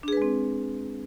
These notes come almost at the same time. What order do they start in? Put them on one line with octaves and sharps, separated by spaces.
D4 G#4 B4 G#3 C4